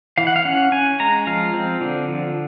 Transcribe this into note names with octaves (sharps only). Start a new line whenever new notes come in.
E3 F5
F#5
F5
C#4 F#5
C#4 G#5
G#3 A#5
F3 F5
C4
D3
F3